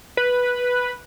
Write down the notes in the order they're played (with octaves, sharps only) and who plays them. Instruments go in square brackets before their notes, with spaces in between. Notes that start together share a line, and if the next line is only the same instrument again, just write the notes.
[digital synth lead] B4